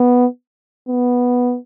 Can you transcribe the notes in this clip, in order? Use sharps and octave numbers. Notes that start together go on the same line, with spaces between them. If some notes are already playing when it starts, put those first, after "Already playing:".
Already playing: B3
B3